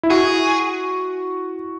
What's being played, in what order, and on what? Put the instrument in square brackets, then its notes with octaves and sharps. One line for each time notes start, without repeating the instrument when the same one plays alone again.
[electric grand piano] E4
[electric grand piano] F#4 [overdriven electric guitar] G#4